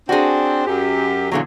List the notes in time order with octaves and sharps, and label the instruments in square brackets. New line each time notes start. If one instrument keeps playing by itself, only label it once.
[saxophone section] C4 D4 [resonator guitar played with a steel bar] F#4 G#4
[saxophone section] F#2 G4
[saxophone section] E2 [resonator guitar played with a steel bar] A#2 D3 F#3